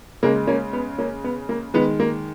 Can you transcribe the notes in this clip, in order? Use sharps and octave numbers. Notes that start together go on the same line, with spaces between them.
C#3 G#3 A#3
A#3 C#4
B3
A#3 C#4
B3
A#3
D#3 G#3 B3
A#3